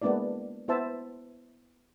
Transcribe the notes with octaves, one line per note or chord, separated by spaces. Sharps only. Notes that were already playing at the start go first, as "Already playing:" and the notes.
G#3 A#3 B3 D4 E4 D5
B3 E4 C5 E5 A5